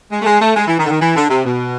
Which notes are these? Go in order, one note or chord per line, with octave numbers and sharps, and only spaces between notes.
G#3
A3
G#3
A3
G#3
E3
D#3
D3
D#3
E3
D3
C3
B2